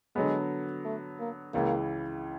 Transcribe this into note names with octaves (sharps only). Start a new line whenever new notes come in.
D3 F#3 G#3 B3
A3
A#3
C#2 C#3 E3 A#3